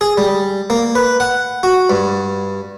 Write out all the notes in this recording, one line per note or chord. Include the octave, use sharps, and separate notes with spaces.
G#4
G3
A#3
B4
F#5
F#4
G2